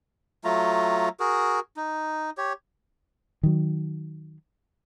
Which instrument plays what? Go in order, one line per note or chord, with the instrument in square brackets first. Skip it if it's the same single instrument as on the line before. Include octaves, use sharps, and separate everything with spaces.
[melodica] F#3 A3 F4 A#5
F#4 G#4 A#4
D#4
G4 C#5
[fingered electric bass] D#3 F#3